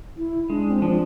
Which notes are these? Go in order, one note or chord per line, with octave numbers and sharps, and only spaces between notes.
E4
G#3 D4
C4
F3 D4